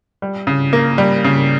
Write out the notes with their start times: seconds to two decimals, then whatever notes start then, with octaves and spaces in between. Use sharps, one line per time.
0.22 G3
0.47 C#3
0.73 A#3
0.98 G3
1.24 C#3